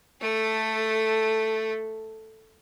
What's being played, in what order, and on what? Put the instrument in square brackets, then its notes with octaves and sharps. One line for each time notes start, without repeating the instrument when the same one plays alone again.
[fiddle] A3 A4